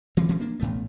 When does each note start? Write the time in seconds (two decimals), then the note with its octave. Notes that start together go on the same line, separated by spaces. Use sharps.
0.17 E3 C4
0.29 E3 C4 C#4
0.40 A#3 D4
0.60 A1 A2 A3 B3